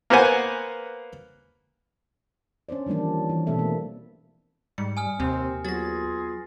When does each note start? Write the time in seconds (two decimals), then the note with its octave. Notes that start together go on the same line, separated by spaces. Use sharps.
0.10 A#3 B3 C5 F#5 G#5
2.69 C#4 D4 C5 D5
2.86 D#3 E3 G3 A#3 D4
2.98 F3
3.29 E3
3.47 B2 A3 C4 E4 A4 E5
3.59 A#3
4.78 G#2 G3 C#7
4.97 G#5 D#6 F6
5.20 D#2 C3 C4
5.65 F#3 B3 F4 G#4 A6 A#6